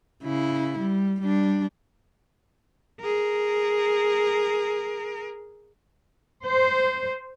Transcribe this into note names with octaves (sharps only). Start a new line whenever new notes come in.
C#3 E4
G3
G3 D4
G#4 A#4
C5